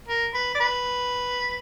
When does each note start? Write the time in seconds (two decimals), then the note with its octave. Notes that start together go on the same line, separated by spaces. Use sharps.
0.08 A#4
0.34 B4
0.55 D5
0.61 B4